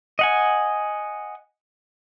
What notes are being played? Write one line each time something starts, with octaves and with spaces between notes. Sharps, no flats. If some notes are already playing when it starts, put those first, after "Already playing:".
D#5 F#5 G#5